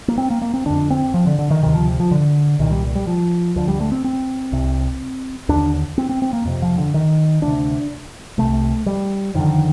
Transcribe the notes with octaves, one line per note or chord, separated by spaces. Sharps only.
A#3
C4
A#3
A#3
C4
F2 D3 D4
C4
F3
D3
D3
D#3
D2 C3 D#3
F3
F3
D3
C2 A#2 D#3
G3
G3
F3
D2 D3 F3
G3
A3
C4
C4
C2 C3
D#2 D3 D4
C4
C4
C4
A#3
F2 C3
F3
D3
D#3
D2 C3 D4
C2 C3 A3
G3
F2 D3 D#3